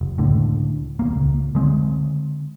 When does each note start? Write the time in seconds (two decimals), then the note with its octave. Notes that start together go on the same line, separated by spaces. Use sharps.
0.01 F1
0.18 C#2 A2 D3
0.99 D#1 E2 A#3
1.15 C#2
1.55 D3 G#3 C4